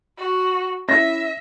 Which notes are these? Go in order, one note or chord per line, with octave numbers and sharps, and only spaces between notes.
F#4
C#4 E4 E5 A#6